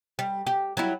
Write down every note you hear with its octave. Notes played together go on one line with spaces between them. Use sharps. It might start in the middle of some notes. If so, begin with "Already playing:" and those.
G3
G4
F#3 G3 E4